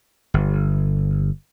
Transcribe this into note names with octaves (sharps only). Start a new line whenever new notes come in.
G1